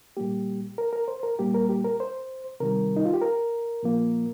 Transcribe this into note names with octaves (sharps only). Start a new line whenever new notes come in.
A#2 G3 A#3 G4
A#4
A#4
C5
A#4
A#2 G3 A#3 G4
A#4
G4
A#4
C5
C3 D#3 G3 A#4
D#4
F4
G4
A#4
A#2 F3 A#3